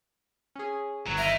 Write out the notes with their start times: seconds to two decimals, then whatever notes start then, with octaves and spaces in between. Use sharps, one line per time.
0.55 C#4 G#4
1.07 G1 F#3
1.18 A#4 D#5 E5